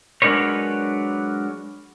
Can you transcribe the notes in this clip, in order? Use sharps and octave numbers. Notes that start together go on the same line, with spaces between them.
F#3 G#3 D4 A#4 B4 C#5